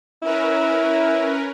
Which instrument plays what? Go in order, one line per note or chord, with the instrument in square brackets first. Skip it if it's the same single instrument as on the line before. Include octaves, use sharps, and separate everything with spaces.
[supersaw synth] C#4 A#4 B4 [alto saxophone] E4